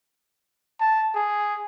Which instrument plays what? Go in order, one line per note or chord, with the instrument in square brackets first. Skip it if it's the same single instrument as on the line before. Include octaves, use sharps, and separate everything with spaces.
[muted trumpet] A5
G#4